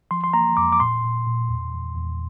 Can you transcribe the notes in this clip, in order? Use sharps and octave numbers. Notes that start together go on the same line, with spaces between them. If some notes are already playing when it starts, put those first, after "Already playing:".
F3 C6
C6
A#3 A#5
F2 D6
D6
A#2 C6
A#2
A#2
E2
E2
E2